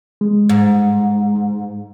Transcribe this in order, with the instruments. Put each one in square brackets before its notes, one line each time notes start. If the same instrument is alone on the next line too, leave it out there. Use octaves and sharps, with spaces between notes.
[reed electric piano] G#3
[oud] G#2